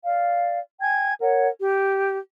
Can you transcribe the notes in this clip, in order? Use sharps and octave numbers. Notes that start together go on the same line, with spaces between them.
D5 F5
G5 G#5 G#6
A#4 C#5 F#5
G4